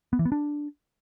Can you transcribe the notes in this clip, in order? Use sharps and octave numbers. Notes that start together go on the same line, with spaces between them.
B3
E3
B3
D4